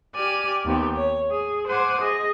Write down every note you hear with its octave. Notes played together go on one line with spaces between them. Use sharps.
G4 D5 G#5 F6
D#2 B3 C4 G4
C#5
G#4
C5 F#5 G#5 D6
G#4 D#5